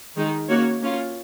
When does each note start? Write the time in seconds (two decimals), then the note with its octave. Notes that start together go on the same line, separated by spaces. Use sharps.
0.16 D#3 G#3 D#4
0.48 A#3 C#4 F#4 C#5
0.81 A#3 C#4 F4